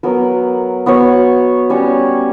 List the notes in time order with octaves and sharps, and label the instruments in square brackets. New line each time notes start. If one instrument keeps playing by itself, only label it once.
[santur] F#3 B3 F#4 A#4
B3 F#4 C#5
G3 C#4 F#4 C#5